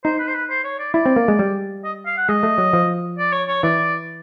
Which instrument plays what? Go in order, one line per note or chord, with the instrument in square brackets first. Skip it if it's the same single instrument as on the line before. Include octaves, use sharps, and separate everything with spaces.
[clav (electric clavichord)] D#4 [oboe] C5
[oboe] B4
C5
B4
C5
C#5
D5
[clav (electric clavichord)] E4 [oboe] D5
[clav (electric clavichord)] C4
A#3
G#3
G3
[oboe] D#5
F5
F#5
[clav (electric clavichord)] G#3 [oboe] D#5
[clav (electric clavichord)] A3
F#3
F3
[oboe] D5
C#5
C#5
[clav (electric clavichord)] E3 [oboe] D5